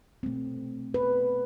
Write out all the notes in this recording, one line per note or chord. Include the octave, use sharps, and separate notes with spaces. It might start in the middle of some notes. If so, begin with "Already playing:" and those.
B2 A3 C4
B4